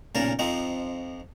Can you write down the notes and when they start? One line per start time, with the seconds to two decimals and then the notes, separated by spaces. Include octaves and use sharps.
0.15 B1 A#2 C#3 A#4 F5 A5
0.39 F2 F3 C4 D#4